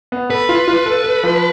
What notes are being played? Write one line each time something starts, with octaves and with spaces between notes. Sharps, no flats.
B3
A4 B4
F4
F4
A4
A4
F3